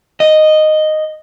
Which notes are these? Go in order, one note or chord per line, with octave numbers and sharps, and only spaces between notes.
D#5